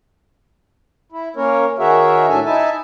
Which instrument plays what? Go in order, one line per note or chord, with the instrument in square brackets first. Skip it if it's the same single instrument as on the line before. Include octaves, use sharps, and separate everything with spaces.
[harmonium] E4
A#3 C#4 A#4 C#5
D#3 F#4 G#4 A#4 C#5 E5
A2 F#3 D4 A4 E5 G#5
D#4 E4 E5 G#5 A5